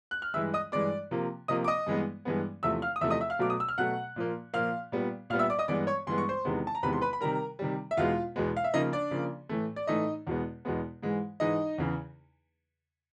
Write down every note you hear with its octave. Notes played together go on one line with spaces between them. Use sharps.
F#6
F6
G2 E3 G#3 E5 E6
D#5 D#6
G2 E3 G#3 D5 D6
C3 F3 A#3
C3 F3 A#3 D#5 D#6
D6
D#5 D#6
G2 E3 G#3 B3
G2 E3 G#3 B3
E2 C3 F3 A3 E5 E6
F5 F6
D#6
E2 C3 F3 A3 E5 E6
D#5 D#6
E5 E6
F5 F6
B2 F#3 A3 D6
D#6
E6
F6
B2 F#3 A3 F#5 F#6
A#2 F3 A#3
A#2 F3 A#3 F5 F6
A#2 G3 B3
A#2 G3 B3 F5 F6
E5 E6
D5 D6
D#5 D#6
G2 E3 G#3 B3 D5 D6
C#5 C#6
G2 E3 G#3 B3 C6
C#6
C5 C6
E2 C3 D#3 G#3 B3
A5
A#5
E2 C3 D#3 G#3 B3 B4 B5
C6
B4 B5
B5
C3 D#3 G3 A#4 A#5
C3 D#3 G3
E5
E2 B2 G#3 B3 F4 F5
E2 B2 G#3 B3
F5
E5
C#3 F3 A#3 D#4 D#5
D4 D5
C#3 F3 A#3
A2 E3 A3
D5
A2 E3 A3 D#4 D#5
E2 B2 G#3 B3
E2 B2 G#3 B3
G#2 E3 G#3
G#2 E3 G#3 D#4 D#5
E2 C#3 E3